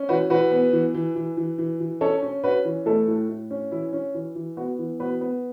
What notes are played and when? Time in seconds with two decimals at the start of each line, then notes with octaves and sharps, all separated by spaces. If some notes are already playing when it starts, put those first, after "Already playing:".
Already playing: C#4
0.09 E3 F#4 B4
0.30 E3 F#4 B4
0.52 B3
0.73 E3
0.94 E3
1.15 E3
1.37 E3
1.58 E3
1.80 E3
2.01 C#4 A4 C#5
2.22 C#4
2.44 C#4 F#4 B4
2.65 E3
2.86 A3 E4 A4
3.08 A2
3.29 A2
3.50 C#4
3.72 E3 E4
3.93 C#4
4.14 E3
4.35 E3
4.57 B3 F#4
4.79 E3
5.00 B3 F#4 B4
5.21 B3